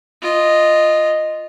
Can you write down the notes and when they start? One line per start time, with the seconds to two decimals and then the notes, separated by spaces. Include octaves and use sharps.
0.22 F4 D#5